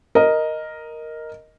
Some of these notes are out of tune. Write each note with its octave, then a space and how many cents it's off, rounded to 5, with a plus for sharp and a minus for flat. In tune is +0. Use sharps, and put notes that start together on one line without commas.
A#4 +0 D#5 +0